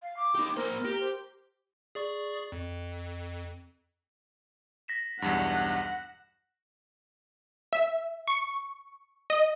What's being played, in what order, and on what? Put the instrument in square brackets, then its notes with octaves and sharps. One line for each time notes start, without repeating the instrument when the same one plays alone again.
[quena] F5
D6
[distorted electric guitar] D#4 G4
[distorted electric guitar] A#3 C5 [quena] A#4
[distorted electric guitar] G4
[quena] C5
[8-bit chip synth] G#4 D5 C#6
F2
[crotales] A#6 B6 E7
[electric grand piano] B1 E2 G2 [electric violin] F#5
[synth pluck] E5
C#6
D#5